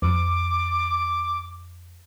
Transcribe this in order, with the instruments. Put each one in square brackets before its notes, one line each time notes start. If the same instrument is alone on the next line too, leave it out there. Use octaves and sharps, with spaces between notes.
[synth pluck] F2 [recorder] D6